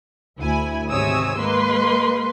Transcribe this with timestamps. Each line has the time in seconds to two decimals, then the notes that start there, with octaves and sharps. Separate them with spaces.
0.38 D2 E4 G#5
0.90 G#1 C3 C#5 G#5 D#6 E6
1.39 G#3 A#3 B4 C6